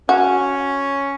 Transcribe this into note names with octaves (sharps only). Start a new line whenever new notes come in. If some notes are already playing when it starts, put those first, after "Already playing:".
C#4 F#4